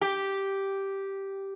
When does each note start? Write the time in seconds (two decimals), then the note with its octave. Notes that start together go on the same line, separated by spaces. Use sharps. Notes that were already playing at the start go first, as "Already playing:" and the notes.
0.01 G4